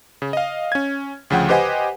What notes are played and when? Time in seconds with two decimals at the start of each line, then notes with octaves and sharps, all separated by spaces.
0.22 C#3
0.33 D#5 F5
0.72 C#4 G#6
1.30 D2 C#3 F3 F#5 G5
1.49 G4 B4 C5 D#5 F#5 G#5